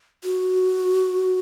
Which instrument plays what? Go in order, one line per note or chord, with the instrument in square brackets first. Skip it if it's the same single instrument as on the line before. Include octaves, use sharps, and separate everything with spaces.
[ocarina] F#4